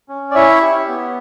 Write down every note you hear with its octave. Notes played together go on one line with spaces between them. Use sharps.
C#4
D5
E4 C#5 E5
G4
B3